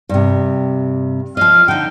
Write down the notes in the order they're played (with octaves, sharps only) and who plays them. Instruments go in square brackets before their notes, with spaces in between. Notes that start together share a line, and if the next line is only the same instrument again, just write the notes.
[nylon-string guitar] G2 C3
[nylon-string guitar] F3 D#5 [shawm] F5
[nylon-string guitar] D3 D#4 [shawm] G5